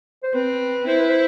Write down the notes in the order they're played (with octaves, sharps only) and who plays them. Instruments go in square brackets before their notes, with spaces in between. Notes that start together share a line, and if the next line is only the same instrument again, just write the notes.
[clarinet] C5
[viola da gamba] C4 [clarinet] B4
[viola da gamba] E4 [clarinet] C5
[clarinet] B4
C5